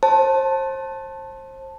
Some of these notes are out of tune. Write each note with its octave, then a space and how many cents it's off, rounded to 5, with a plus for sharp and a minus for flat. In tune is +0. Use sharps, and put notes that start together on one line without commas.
C5 +30 A5 +0